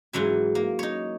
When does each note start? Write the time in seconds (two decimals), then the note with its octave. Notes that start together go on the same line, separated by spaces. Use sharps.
0.13 G#2 E3 F#3 G#5
0.55 A#3
0.79 D#4 C#5